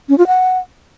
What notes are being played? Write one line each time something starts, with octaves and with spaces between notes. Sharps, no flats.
C#4
F4
F#5